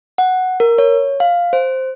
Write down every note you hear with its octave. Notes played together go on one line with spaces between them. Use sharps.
F#5
A#4
C#5
F5
C5